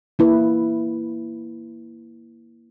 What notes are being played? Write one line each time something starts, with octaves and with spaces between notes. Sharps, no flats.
A#3 E4 B4